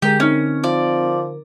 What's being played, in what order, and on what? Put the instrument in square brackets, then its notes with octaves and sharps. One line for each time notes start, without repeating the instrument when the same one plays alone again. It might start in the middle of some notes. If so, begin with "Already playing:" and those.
[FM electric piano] D3 A#4 [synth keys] G#3 G#4 [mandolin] G4
[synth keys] C4 D#4 [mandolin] C#4
[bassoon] F3 [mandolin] D5